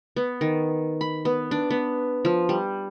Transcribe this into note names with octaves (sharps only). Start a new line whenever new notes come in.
B3
D#3
B5
B3
D4
B3
F3
G3